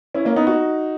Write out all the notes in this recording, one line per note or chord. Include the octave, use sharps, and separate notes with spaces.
C#4 E4
A#3 C#4
B3 D#4
D#4 F#4